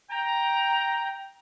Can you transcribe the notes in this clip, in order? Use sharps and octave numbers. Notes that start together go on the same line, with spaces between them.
G5 A#5